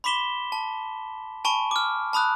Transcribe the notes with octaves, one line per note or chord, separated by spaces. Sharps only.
B5 C6 D6 B6 E7 G7
A5
G#5 A5 B5 C#6 D7
D6 F6
A5 B5 D#6 F#6